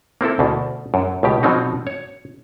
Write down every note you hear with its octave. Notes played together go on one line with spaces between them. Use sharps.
A#3 C4 E4 A4
D2 B2
F#2
C#2 B2 G4
B2 F3 F#3 C4 D#4
C#5